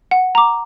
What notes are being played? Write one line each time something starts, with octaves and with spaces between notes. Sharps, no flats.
F#5
A#5 D6